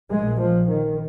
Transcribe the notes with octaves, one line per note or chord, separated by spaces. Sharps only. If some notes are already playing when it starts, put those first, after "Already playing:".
A#1 A#2 G#3
F3
D#3